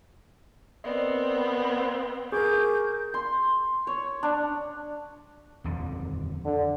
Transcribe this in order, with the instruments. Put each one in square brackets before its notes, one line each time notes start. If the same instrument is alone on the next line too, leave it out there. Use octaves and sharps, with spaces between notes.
[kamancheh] B3 C4 [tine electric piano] A#4 D5 D#5
[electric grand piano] G#4 A#4 [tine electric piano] C#6 D6 [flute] G6
[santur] C6
C#5
D4
[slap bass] D#1 F2 D3
[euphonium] D3